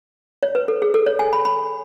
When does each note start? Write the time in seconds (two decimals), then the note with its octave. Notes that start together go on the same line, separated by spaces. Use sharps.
0.43 C#5
0.55 B4
0.68 A4
0.82 G#4
0.94 A4
1.06 C#5
1.19 G#5
1.33 B5
1.45 B5